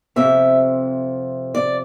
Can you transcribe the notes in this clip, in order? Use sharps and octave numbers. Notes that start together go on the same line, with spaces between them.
F2 C3 F3 E5
D5